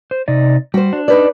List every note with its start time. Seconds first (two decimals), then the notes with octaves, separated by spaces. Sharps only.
0.11 C5
0.28 C3 D#4 D5
0.74 G3 F#4 C5
0.93 D4
1.08 D#4 B4 D5